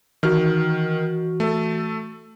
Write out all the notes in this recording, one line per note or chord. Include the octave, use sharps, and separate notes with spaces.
D#3 E3 F#4 F6
A3 A4